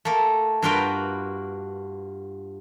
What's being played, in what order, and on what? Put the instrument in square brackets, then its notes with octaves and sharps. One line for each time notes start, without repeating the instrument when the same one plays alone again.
[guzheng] A3 A#3
G2 A#3 F4 F#4 B4 G5